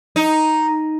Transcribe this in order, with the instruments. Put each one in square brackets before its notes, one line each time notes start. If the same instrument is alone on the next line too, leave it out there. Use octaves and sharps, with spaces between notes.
[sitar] D#4